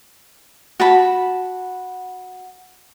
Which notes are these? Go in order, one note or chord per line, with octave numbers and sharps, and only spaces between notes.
F#4 A5 B5